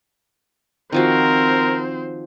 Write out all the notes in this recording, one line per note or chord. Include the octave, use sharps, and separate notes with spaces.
D#3 F3 C4 F#4 A#4 C5